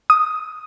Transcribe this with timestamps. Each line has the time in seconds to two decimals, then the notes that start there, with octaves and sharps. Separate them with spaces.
0.10 D#6